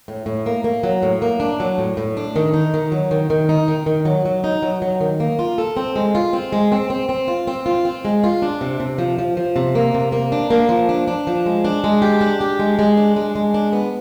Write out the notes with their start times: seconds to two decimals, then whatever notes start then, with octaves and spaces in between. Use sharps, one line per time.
0.08 A2
0.26 A2
0.46 A#3
0.64 A#3
0.83 F#3
1.02 A2
1.22 A#3
1.40 D4
1.60 F#3
1.78 A2
1.97 A2
2.17 D4
2.36 D#3
2.54 D#4
2.74 D#3
2.92 F#3
3.11 D#3
3.30 D#3
3.49 D#4
3.68 D#3
3.86 D#3
4.05 F#3
4.25 F#3
4.44 D#4
4.62 F#3
4.82 F#3
5.01 D#3
5.20 A#3
5.39 F4
5.58 A4
5.77 C4
5.96 G#3
6.15 F4
6.33 C4
6.52 G#3
6.72 C4
6.90 C4
7.09 C4
7.28 F4
7.47 C4
7.66 F4
7.85 C4
8.05 G#3
8.24 F4
8.42 D4
8.61 C3
8.80 C3
8.98 F3
9.18 F3
9.37 F3
9.56 C3
9.75 A#3
9.94 C3
10.12 A#3
10.32 D4
10.50 A#3
10.69 F3
10.89 D4
11.08 D4
11.27 F3
11.46 G#3
11.65 D4
11.84 G#3
12.02 G4
12.21 D4
12.41 G4
12.59 G#3
12.79 G#3
12.97 D4
13.16 G#3
13.35 G#3
13.54 D4
13.73 B3